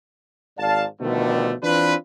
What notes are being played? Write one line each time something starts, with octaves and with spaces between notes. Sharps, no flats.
G#1 G#2 D5 F5 A5
B2 D3 D#3 F3 G3 A3
E3 C4 D4 F4 B4